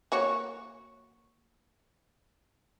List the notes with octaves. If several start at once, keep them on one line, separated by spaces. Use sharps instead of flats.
A#3 F#4 C#5